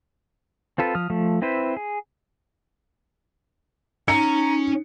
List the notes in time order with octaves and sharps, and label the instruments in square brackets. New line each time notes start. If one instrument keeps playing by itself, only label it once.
[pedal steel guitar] C4 F4 A4 B4
F3 D#6 F6
F3 A3
C4 E4 B4 C5
G#4
[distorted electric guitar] C#4 [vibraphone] D#4 [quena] A#5 [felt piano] C#7